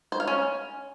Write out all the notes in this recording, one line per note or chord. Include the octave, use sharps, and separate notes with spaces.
C5
F5
C#4